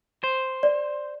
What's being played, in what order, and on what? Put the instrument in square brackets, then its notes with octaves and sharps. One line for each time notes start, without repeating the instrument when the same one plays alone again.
[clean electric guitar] C5
[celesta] D5